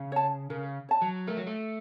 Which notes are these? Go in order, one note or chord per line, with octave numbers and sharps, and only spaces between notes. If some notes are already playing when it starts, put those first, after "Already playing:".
Already playing: C#3
C#5 A5
C#3 A#4
C#5 A5
F#3
A3 A#4
F#3
A3